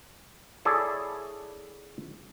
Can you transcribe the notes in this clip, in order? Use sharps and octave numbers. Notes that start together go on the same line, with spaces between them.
E4 G#4 A4 C#5 D5